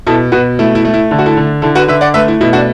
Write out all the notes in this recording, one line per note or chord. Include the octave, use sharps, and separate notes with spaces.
B2 E4 A4
B2 F#4 B4
A3 E4
E4
A3
E4
D3 A4
F#4
E4 A4
D3
D3 E4 A4
F#4 B4
D3 B4 E5
D5 F#5
A3 B4 E5
E4
B2 E4
D4 F#4